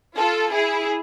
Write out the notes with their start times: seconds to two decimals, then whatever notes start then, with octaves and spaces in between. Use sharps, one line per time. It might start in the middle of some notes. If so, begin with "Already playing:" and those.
0.16 F4 A4
0.52 E4 G#4